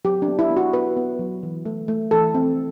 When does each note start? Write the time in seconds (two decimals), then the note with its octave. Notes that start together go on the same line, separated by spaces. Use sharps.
0.05 F#3 G4
0.22 D4
0.28 B3
0.39 E4
0.50 B3
0.57 F#4
0.73 B3 B4
0.97 B3
1.19 F#3
1.43 E3
1.65 A3
1.88 A3
2.11 E3 A4
2.35 C4